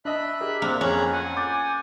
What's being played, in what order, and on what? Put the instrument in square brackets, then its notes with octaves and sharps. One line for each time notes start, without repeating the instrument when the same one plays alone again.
[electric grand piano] D4 D#5 A5 [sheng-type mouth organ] E5 B5 F#6
[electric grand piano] G4 G#4 A#4
[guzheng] A#3 [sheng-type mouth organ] C4 D4
[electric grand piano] F2 [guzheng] C#4 [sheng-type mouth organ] G#4 A#5 F#6
[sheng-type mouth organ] F#5 G#5
[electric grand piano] D6 G6 A6